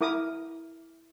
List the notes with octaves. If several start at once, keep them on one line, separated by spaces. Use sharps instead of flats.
E4 A#4 D6 D#6